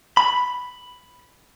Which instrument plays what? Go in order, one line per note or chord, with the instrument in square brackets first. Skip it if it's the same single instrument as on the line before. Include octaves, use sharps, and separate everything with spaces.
[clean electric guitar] B5